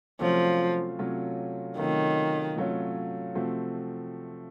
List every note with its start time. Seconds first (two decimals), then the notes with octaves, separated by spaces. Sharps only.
0.21 C3 F3 F#3 A3 C#4 F4
0.99 C3 F#3 A3 C#4 F4
1.78 C3 D#3 F#3 A3 C#4 F4
2.56 C3 F#3 A3 C#4 F4
3.35 C3 F3 A3 C4 F#4